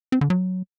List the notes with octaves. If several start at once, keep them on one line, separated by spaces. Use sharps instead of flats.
C4
D3
F#3